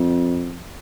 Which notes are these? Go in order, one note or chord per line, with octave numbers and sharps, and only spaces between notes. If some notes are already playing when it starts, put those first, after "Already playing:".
Already playing: F2